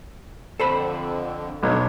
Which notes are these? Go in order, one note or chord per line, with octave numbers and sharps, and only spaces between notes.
F2 D3 A4 C5 B5
B1 D3 D4 C#5